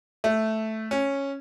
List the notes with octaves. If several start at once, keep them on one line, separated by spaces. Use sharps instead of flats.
A3
C#4